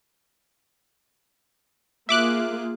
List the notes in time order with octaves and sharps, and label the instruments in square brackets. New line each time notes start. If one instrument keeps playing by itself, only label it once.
[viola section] A#3 F4 G#4 [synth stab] E5 D6 F#6